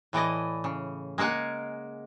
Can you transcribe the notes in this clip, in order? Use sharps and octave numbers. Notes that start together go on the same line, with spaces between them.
A2 E3 D5 D#5
C#3
G#3 A#3 F5 F#5 G#5